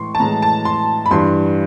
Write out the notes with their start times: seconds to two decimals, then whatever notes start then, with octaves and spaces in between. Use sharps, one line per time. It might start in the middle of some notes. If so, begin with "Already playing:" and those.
Already playing: A2 E3 G#3 C6 C#6
0.15 A5
0.20 A2 E3 G#3 A#5
0.42 A5
0.65 C6
1.06 B5
1.11 G2 E3 G3 C6